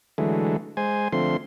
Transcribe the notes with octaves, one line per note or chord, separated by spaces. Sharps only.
D3 E3 F#3 G#3 A3
G#3 C5 G#5
D3 F3 A3 C4 C6